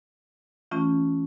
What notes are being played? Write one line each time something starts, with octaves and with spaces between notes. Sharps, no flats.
E3 A3 C#4 F4